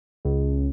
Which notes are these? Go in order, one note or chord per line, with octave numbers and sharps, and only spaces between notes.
C#2